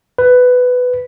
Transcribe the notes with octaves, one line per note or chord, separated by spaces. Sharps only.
B4